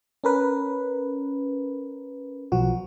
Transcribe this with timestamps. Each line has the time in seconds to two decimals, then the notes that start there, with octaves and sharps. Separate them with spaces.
0.24 C#4 A#4 B4
2.52 B1 F3 F#4